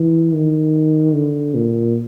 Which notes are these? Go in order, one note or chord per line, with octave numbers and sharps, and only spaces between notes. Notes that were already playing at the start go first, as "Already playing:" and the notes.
Already playing: E3
D#3
D3
A#2